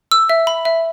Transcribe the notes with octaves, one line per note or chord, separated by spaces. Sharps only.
E6
E5
B5
E5